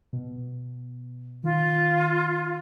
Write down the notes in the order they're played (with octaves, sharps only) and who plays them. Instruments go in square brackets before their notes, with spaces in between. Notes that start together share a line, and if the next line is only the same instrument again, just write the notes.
[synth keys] B2
[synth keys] D#3 [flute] F4